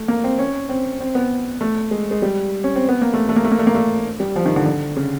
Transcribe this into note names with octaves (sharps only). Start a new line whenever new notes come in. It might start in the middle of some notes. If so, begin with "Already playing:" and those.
Already playing: A3
A#3
C4
C#4
C4
C4
B3
A3
G#3
G#3
G3
C#4
C4
B3
A#3
A3
A3
A#3
A3
A#3
A3
A#3
A3
G3
F3
D#3
D3
D3
C#3